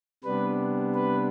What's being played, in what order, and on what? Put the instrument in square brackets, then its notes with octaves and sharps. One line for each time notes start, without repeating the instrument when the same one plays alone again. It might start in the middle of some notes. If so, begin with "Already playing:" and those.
[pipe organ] C3 G3 B3 D4 B4
B4